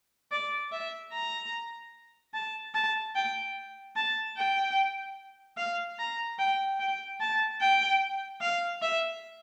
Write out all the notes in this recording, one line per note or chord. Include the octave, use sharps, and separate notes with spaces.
D5
E5
A#5
A5
A5
G5
A5
G5
F5
A#5
G5
G5
A5
G5
F5
E5